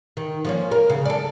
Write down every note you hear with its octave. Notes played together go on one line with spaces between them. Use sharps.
D#3
F3 A#3 C#4
A#4
C#3
A4 D5